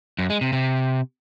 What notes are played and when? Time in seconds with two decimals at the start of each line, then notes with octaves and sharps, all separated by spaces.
0.19 F#2
0.30 G#3
0.41 C3
0.53 C3